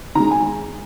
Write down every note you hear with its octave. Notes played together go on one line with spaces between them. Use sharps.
D#3 G#3 A#5
G#5